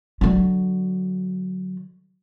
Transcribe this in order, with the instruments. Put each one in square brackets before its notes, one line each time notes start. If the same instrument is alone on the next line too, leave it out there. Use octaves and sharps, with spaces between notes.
[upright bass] D3 F#3